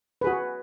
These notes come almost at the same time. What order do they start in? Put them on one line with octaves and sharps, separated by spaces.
B4 G#4 F#4